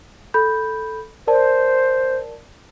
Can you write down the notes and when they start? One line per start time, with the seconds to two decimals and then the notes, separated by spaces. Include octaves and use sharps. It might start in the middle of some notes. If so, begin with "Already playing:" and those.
0.34 A4 B5 G6
1.27 A#4 C5 D5 A5